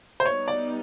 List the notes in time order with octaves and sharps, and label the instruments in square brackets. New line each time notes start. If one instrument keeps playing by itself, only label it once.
[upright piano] C5
[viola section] G3 B3 D#4 [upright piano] C#5
[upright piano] D5